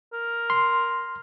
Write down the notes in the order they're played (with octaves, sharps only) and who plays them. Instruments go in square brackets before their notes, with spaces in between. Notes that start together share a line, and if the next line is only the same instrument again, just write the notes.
[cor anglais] A#4
[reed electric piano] C6